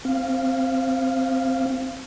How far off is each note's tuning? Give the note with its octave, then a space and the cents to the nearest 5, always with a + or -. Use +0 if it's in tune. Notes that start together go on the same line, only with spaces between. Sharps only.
C4 +0 F5 -15